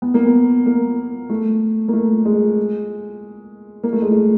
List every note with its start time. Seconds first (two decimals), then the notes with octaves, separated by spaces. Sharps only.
0.02 B3
0.14 A#3
0.25 B3
0.66 A#3
1.30 A3
1.88 A#3
1.93 A3
2.25 G#3
3.83 A#3
3.93 A3
4.02 G#3
4.11 A3